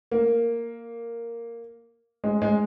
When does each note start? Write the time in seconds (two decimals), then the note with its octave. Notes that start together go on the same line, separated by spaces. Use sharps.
0.11 A#3
2.24 G#3
2.42 G#3